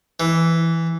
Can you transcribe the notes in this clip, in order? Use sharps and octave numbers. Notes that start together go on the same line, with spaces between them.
E3